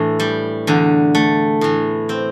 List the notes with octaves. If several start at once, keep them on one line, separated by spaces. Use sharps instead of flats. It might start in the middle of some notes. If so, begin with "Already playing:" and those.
Already playing: A2 E3 A3 D4
G3
E2 D3
A3
A2 E3
C4